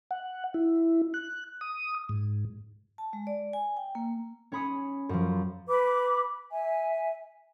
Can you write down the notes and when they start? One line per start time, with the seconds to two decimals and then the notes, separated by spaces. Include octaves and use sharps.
0.11 F#5
0.54 E4
1.14 F#6
1.61 D#6
2.09 G#2
2.98 A5
3.13 G#3
3.27 D5
3.53 G#5
3.77 G5
3.95 A#3
4.52 C#4 C#5 B5 D#6 C#7
5.09 F#2 F3
5.68 B4 B5 D6
6.51 E5 G#5